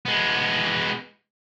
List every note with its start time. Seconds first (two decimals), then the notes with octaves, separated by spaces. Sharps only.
0.05 G#3 B3